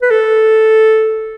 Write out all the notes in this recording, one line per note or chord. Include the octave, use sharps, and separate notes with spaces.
B4
A4